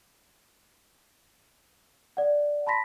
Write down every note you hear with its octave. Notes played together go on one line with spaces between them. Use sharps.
D5 F#5
A5 B5 C6 A#6 B6